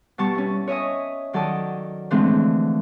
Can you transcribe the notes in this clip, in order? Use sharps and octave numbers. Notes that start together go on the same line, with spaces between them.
B2 G3 A5 C#6
C#4 E4
C#5 D#5 E5 G#5 D#6
D#3 F#3 A4 D5 A5 D#6
D3 E3 F3 G#3 A3 C4